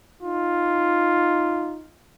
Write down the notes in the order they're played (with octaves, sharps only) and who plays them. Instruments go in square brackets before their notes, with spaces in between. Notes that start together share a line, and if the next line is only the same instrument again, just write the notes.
[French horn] D#4 [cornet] F4